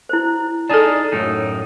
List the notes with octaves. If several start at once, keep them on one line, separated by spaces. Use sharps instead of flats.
E4 C5
D#4 G#4 A4 D5 A5
F#2 A2 D#4